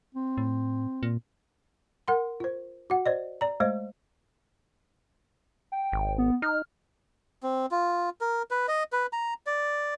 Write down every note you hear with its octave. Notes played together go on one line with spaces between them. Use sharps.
C4
A2
A#2
A#4 F#5 C6
F4 C5
F#4 F#5
C5 D5 D#5
D5 A#5
G#3 A3 C5 D#5
G5
G#1
B3
D#4 F6
C4
F4
A#4
B4
D#5
B4
A#5
D5